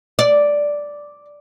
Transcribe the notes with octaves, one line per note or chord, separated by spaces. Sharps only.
D5